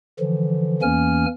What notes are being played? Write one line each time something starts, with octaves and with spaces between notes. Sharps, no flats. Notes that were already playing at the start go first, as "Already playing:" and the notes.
D3 E3 F3
E2 E3 A#3 C#4 G#5 F6